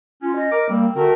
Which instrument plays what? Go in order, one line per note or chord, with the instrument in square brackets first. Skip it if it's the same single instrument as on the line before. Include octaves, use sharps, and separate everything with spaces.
[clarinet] C#4 [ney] F4
[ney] D#5
[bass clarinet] A#4 [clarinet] D6
[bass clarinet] G3 [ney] A#3 [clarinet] C4
[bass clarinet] D3 [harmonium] A3 A#4 [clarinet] C4 [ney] F#4